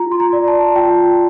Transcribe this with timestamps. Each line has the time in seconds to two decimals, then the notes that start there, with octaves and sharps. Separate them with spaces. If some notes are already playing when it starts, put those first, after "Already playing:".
Already playing: F4 A#5
0.11 C6
0.20 A#5
0.33 D5
0.48 A5
0.76 F4 G5